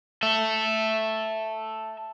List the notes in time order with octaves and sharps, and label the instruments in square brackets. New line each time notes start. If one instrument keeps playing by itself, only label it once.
[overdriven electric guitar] A4 E5